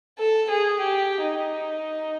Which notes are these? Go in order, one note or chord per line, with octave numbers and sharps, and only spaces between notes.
A4
G#4
G4
D#4